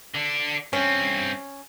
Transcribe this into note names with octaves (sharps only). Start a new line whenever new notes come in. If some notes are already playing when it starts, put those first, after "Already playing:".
D3 D4
G2 C4 C#4